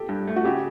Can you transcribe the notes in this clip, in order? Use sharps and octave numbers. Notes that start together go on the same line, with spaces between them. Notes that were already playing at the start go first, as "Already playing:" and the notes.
Already playing: G4 A4
G2
A3
F#4
C#3 G4